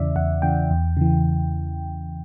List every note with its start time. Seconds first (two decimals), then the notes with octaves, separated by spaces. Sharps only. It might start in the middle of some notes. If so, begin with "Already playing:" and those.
Already playing: E2 C#3 E3 D5 E5
0.16 E2 F#5
0.42 C#3 E3 G5
0.71 E2
0.97 C#3 E3